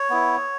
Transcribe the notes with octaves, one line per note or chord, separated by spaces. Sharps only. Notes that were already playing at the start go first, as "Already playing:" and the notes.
Already playing: C#5
B3 E4